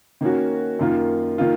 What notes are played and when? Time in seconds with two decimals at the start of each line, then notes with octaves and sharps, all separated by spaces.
0.21 D#3 A#3 C#4 F#4
0.79 F#2 D#3 A#3 F4
1.38 D#3 A#3 F4